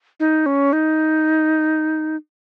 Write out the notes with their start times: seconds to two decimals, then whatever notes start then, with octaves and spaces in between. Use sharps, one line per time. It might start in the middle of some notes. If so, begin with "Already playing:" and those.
0.20 D#4
0.46 C#4
0.73 D#4